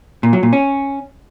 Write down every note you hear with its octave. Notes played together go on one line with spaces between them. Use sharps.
A#2
F#3
A#2
C#4